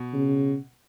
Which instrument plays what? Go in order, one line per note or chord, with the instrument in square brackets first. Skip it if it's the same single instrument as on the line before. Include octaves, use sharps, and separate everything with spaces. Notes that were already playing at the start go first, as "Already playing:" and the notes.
Already playing: [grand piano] B2
[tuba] C#3